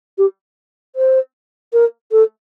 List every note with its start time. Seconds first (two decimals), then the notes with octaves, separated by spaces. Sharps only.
0.18 G4
0.95 C5
1.73 A#4
2.11 A4